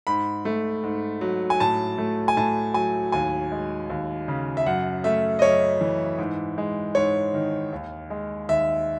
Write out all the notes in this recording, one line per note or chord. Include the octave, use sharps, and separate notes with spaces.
G#2 B5
A3
G#2
F#3
G#5
A2 A5
A3
G#5
A2 A5
F#3 G#5
D#2 G#5
G#3
D#2
C#3
E5
F#2 F#5
A3 E5
D#5
F#2 C#5
E3
G#2
G#3
G#2 C#5
D#3
D#2
G#3
D#2 E5